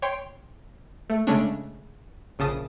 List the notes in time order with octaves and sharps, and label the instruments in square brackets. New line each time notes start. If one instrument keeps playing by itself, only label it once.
[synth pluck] C#5 G5 C6
A3
C#3 G#3 A3 C#4 D4
A#1 C#3 A5 D#6